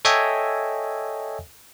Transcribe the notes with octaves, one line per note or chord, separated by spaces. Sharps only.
A4 C#5 D#5 E5 G5 G#5